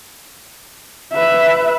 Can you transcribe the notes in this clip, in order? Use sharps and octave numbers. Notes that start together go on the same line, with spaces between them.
B4 E5